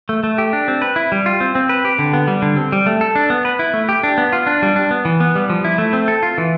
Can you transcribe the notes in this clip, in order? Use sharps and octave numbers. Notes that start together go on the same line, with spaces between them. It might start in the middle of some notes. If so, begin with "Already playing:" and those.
A3
A3
G4
D4
C4
B4
E4
G3
F4
C4
C4
B4
G4
D3
B3
G3
D3
C4
G3
A3
A4
D4
B3
B4
E4
A3
G4
D4
B3
F4
D4
G3
D4
B3
E3
B3
G3
F3
E4
A3
C4
A4
F4
E3